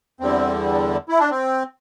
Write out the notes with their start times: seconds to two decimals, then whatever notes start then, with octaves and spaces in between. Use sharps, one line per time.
0.20 E2 D3 G3 C4
1.09 E4
1.19 D4
1.30 C4